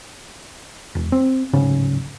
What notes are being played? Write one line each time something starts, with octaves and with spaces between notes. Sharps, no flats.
E1
C4
D1 G#2 C#3 C#4